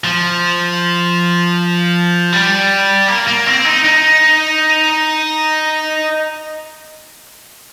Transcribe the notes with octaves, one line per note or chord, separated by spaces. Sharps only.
F3
G3
A#3
A#3
C4
D#4
D#4